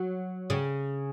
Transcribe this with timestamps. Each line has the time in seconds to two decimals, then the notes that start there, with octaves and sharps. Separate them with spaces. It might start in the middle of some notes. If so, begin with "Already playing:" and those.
Already playing: F#3
0.50 C#3